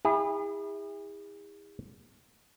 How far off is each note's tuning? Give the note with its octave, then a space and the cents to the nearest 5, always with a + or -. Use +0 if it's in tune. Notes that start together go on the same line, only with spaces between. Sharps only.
E4 -20 G#4 -40